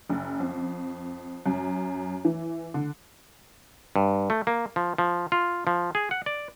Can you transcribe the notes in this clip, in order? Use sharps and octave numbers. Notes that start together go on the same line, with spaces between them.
F#1
F2
F#2
E3
D3
G2
A3
A#3
F3
F3
F4
F3
G#4
F#5
D5